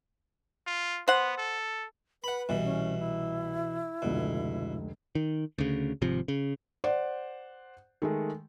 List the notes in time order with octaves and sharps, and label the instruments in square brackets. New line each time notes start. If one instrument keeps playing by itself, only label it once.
[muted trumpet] F4
[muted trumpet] B3 [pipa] C5 F#5
[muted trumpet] A4
[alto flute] B4 [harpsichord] F#5 B5
[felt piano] C2 [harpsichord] B2 E3
[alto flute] C#4
E4
[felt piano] F1 C#2 D3 [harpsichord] B2
[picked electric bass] D#3
D2 C#3
G#1 C3 F3
C#3
[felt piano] C5 D5 F#5
D#3 G#3 A3